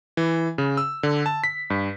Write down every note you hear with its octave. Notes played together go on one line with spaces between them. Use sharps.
E3
C#3
E6
D3
A5
B6
G2